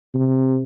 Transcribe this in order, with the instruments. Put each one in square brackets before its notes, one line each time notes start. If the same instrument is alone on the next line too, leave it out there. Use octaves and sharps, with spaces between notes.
[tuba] C3